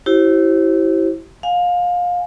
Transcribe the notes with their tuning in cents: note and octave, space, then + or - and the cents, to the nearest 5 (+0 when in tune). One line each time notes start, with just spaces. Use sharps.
E4 +0 G4 -35 C5 +30
F5 +25 G#5 +0